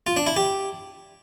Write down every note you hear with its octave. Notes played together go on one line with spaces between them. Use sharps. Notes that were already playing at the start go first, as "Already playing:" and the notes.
F4
D4
E4
G4